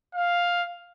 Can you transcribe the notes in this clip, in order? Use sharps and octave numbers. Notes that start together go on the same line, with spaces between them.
F5